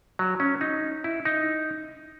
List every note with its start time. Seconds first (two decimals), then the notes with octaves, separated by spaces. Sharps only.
0.19 F#3
0.40 C#4
0.61 D#4
1.04 E4
1.25 D#4